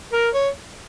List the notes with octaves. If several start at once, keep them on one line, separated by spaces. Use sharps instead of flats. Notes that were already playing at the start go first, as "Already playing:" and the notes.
A#4
C#5